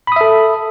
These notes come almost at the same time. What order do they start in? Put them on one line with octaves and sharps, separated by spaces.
B5 D#6 E5 A4